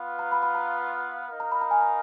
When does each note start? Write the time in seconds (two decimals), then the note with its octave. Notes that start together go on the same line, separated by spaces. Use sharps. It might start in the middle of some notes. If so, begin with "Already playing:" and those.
Already playing: B3 F4 B4 F5
0.19 A#5
0.32 B5
0.43 B5
0.55 A#5
1.27 D#4 A#4 F5
1.40 A#5
1.52 B5
1.61 A#5
1.71 G#5
1.82 A#5